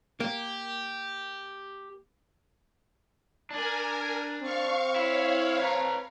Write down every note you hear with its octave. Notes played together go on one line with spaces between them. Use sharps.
A#3 G4
D4 A#4 G#5
C4 F5 C#6
E4 C#5 F5
B4 A#5